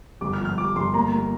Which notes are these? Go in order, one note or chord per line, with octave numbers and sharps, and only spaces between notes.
G1 D6
F6
F3
F6
F3 D6
G1 C6
A#3 A#5
A#3